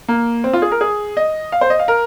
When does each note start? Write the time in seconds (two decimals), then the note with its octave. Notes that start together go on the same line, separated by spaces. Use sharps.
0.08 A#3
0.44 C4
0.53 F4
0.62 G#4
0.72 A#4
0.81 G#4
1.17 D#5
1.52 F5
1.61 C5
1.70 D#5
1.79 F5
1.88 A#4